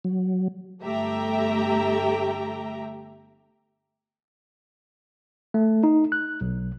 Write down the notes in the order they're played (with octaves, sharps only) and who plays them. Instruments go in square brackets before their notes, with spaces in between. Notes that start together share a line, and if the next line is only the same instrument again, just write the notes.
[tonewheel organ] F#3
[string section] G1 A3 G4 E5 G5 A#5
[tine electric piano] A3
D#4
F#6
B1